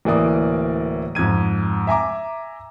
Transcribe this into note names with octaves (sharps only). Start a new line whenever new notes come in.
D1 E3 A#3 D5 D#6
F2 G#2 G#6 D#7
E5 G#5 A#5 D6